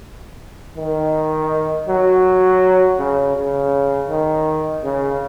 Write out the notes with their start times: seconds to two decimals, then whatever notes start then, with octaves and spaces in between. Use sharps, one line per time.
0.77 D#3
1.88 F#3
2.99 C#3
3.36 C#3
4.09 D#3
4.84 C#3